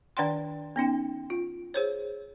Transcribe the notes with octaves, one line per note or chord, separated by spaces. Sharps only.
D#3 D4 D5 F#5 G5 C6
B3 C#4 D#4 G5
F4
G#4 C5 C#5